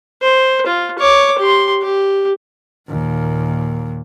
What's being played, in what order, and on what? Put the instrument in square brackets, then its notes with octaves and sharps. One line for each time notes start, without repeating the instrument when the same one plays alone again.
[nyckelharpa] C5
F4
C#5 D6
G4 C6
G4
[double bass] D#2 A#2